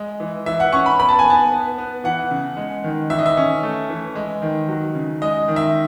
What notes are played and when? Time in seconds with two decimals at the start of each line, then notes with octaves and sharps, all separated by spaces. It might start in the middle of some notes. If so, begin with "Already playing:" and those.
Already playing: G#3
0.20 E3
0.46 E3 E5
0.60 F#5
0.72 C#4 C#6
0.86 B5
0.99 B3 B5
1.09 A5
1.19 G#5
1.25 B3
1.30 A5
1.52 B3
1.78 B3
2.04 E3 F#5
2.31 C#3
2.57 G#3
2.84 D#3
3.10 E3 E5
3.18 D#5
3.26 E5
3.37 C#4
3.63 A3
3.89 E3
4.15 G#3
4.42 D#3
4.69 F#3
4.95 C#3
5.22 G#3 D#5
5.48 D#3
5.56 E5